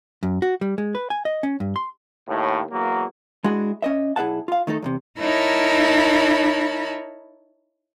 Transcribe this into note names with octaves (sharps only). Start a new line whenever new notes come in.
F#2
F#4
G3
G#3
B4
G#5
D#5
C#4
G2
C6
D#2 A2
E2 F#3 A#3
G#3 D4 E4 F#4 G#4
C#4 D#5 E5
B1 E4 G#4 E5 F#5 A5
F4 F5
D#3 A3 D#4 A4
E2 A2 C3
D#4 E4 A#4 C#5 A5 B5